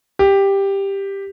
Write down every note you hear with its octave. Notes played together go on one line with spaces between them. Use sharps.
G4